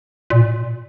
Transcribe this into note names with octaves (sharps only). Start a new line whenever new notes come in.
A#2